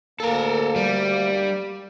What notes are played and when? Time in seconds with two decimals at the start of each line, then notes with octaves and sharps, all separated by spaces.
0.20 D2 A#3 A4 A#4
0.76 G3